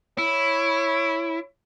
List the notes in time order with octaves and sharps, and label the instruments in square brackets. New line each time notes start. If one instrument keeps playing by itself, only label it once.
[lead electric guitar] E4 [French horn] C#5